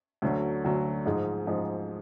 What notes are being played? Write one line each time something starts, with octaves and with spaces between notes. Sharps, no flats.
D2 D3 F#3
D2 D3 F#3
G#2 F3 G#3 D#4
G#2 F3 G#3 D#4